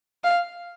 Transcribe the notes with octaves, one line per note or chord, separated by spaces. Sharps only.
F5